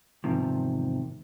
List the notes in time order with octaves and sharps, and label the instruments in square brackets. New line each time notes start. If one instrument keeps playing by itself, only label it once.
[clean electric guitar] E2 G#2 C3 D#3 F3